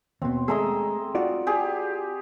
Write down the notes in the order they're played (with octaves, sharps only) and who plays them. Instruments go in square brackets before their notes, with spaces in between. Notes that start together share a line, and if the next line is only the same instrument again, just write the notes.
[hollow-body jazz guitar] D#2 B2 [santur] C4
[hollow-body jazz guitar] G#3 A3 G#4 [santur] D#5 A#5 E6
[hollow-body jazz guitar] F4 F#4 D5
[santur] G4 G#4